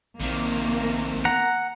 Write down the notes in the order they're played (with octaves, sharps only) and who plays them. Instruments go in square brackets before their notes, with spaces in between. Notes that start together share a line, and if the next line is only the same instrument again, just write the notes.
[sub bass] A#1 [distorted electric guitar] C3 D#3 [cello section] A#3
[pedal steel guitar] F#5 A#5